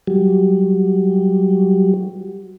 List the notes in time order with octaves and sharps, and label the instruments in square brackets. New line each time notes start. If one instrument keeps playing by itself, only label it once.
[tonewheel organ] F#3 G3